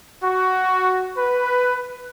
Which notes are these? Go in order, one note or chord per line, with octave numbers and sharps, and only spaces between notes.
F#4
B4